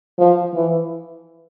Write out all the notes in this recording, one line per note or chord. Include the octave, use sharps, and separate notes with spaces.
F3
E3